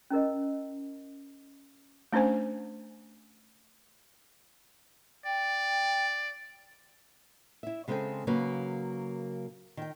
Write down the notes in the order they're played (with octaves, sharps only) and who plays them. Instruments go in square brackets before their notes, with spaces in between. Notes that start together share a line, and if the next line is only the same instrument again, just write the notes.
[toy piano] C#4 E4 A#4 D#5
[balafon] A3 C#4 D4 C5 G#5
[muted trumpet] D5 [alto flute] G5
[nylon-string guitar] E4 E5
C#3 G#3 C4 G#4 A4 G5
C#3 F#3 A#3 A#4 B4
D#3 G5